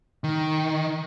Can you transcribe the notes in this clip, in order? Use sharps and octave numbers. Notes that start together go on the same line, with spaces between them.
D#3